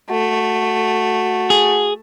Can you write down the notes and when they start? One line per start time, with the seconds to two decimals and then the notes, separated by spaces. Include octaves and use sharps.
0.10 A3 F#4
1.50 G#4